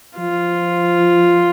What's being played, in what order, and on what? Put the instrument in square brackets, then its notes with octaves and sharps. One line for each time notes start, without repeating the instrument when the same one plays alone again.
[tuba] F3 [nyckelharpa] F4